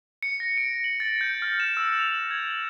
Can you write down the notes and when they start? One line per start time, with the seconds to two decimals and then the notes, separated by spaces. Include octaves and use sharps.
0.23 C#7
0.40 A#6
0.57 D7
0.84 F#7
1.00 A6
1.21 G6
1.42 F6
1.60 E7
1.77 E6
1.99 F7
2.31 G#6
2.50 F#7